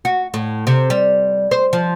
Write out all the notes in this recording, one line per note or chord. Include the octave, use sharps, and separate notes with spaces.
F#4
A2
C3
G3
C5
F3